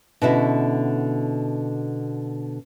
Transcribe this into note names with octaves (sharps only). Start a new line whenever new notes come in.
B2 D3 C#4 E4 F#4